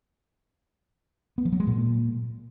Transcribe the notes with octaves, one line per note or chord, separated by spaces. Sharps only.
B3
F3
F#3
G#3
A#2